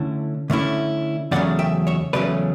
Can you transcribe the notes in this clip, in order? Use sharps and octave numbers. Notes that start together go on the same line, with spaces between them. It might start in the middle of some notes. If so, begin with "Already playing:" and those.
Already playing: D3 A3 C#4 E4
D3 A3 C#4 E4
E2 C#3 F#3 A3 C#4 D5 F#5
E5 G5
C#5 E5
E2 C#3 F#3 A3 C#4 B4 D5